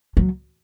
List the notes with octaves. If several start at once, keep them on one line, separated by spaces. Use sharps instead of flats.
F#3